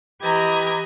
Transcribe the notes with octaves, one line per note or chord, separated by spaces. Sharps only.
E3 G4 B4 D#5 A#5 G#6